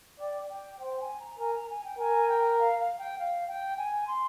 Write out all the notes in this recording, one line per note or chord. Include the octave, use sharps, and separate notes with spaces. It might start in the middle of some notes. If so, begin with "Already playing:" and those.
D5 G5
G5
C5 G5
G5
G#5
A#5
A#4 G#5
A#5
G#5
G5
A#4 G#5
G5
F5
F5
G5
F5
G5
G#5
C6